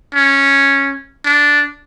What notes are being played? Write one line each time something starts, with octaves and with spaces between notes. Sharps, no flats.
C#4
D4